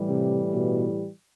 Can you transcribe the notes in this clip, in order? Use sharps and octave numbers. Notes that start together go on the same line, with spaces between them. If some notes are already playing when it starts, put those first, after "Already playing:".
Already playing: A2 E3 G3
C3
B2